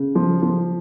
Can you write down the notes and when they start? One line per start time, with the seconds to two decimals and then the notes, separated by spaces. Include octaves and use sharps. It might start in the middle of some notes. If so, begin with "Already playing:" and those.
Already playing: C#3
0.15 F3
0.42 F3